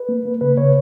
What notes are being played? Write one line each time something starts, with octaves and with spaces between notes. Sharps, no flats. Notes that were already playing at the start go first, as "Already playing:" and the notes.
Already playing: B4
A#3
A#3
C#3 B4
C#3 C#5